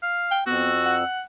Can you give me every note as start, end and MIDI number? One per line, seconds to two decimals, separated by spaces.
0.03 0.37 77
0.31 0.45 79
0.47 1.04 41
0.47 0.71 59
0.47 0.95 66
0.47 1.04 88
0.86 1.22 78